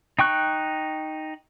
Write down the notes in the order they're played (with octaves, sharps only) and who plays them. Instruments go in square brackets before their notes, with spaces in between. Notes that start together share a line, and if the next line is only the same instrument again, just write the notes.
[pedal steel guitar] D#4 G5 C#6 F#6